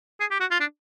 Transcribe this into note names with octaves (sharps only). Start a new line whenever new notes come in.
G#4
G4
F#4
F4
D4